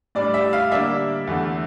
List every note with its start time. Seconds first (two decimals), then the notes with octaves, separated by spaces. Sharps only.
0.15 A2 G3 D4 D5
0.34 E5
0.53 F5
0.72 D3 G3 A#3 D4 E5
1.27 E2 D3 A3